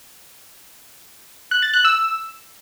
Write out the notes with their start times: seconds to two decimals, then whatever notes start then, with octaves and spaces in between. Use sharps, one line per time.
1.51 F#6
1.62 A6
1.73 F#6
1.85 E6